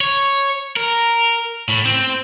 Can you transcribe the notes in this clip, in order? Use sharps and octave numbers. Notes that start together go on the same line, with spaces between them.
C#5
A#4
A2
C4